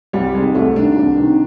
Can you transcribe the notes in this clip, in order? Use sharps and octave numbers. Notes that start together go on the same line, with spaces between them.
C2 G3
C3 D#3 G#3
C2 A3
C3 D#3 D4
C2
C3 D#3